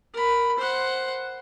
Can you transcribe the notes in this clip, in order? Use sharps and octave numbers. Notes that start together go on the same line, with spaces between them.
A#4 B5
C5 F#5